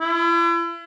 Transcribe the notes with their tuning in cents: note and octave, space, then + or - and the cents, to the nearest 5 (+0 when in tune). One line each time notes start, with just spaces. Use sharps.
E4 +40